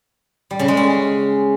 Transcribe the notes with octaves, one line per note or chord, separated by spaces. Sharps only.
G3
C#3
G#3
C#4